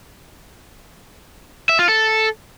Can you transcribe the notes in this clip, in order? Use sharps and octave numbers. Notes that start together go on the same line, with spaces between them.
E5
F4
A4